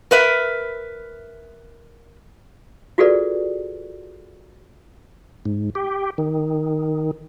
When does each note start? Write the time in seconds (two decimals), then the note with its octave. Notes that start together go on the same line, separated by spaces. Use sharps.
0.11 A#4 B4 E5
2.98 F4 F#4 G#4 A4 B4 D5
5.45 G#2
5.75 G4
6.18 D#3